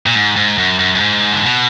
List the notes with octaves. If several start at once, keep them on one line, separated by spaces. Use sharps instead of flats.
A#2
G#2
G#2
F#2
F#2
F#2
G#2
D3
B2